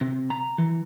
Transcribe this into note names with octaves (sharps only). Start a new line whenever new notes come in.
C3
A#5
E3